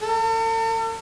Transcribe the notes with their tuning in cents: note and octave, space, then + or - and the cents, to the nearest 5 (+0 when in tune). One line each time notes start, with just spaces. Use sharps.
A4 +45